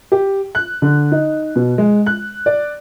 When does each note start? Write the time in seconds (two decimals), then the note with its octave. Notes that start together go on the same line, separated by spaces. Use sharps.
0.12 G4
0.55 F#6
0.82 D3
1.12 D#4
1.56 B2
1.78 G#3
2.06 F#6
2.46 D5